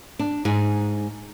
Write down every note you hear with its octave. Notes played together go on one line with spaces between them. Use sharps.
D4
G#2 D#4 G#4